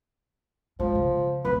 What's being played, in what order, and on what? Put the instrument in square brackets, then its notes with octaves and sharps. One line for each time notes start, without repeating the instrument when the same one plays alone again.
[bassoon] F3 [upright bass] G#3
[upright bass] C#3
[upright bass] D1 [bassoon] B4